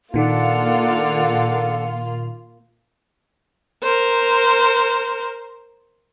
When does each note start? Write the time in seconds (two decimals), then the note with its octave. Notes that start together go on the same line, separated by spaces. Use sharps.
0.14 A#2 D#3 A#3 D4 F4 A4 F#5
3.83 A#4 C5